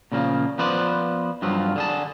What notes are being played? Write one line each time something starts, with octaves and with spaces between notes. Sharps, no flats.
A#2 C#3 F3 A#3
F3 B3 B4 C5 D5
G2 F3 F#3 F4
D3 G#4 A5